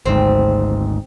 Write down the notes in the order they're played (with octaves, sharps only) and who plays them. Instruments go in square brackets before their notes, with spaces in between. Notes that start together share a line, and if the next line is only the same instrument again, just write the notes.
[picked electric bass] G#1 D2 G#2 [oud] C4